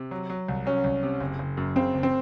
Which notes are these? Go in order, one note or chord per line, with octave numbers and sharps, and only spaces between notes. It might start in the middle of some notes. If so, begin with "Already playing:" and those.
Already playing: C3
F#3
F#3
C2
F#3 C#4
C2
C3
F#1
F#1
F#2
C#3 C4
F#1
C4